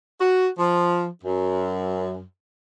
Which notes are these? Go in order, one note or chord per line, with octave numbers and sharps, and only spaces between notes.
F#4
F3
F#2